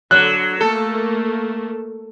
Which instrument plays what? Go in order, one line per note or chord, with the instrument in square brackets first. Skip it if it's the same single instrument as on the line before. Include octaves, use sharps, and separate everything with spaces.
[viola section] D3 [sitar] F#3 [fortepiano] F#6
[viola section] A3 A#3 [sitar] A4